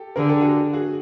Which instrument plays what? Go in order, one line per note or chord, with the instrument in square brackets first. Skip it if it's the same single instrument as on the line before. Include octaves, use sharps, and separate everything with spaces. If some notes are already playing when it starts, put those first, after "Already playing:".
Already playing: [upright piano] G4 A4
[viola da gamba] D3 [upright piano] G#4 A#4
[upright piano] G4 A4
F#4 G#4
F#4 G#4